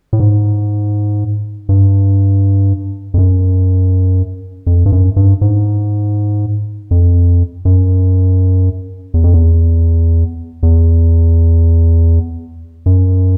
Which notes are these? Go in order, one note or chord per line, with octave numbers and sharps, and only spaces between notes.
A2
G#2
G2
F2
F#2
F2
G2
F#2
G2
G#2
F2
F#2
E2
F2
E2
E2
F#2